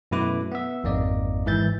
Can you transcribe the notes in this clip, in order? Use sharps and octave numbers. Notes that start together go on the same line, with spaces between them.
F#2 B2 A3 E4 B4 D6
B3 E5
G#1 F2 A#3 D#4 D5 D#5
G#2 D#3 E3 E5 G6 A6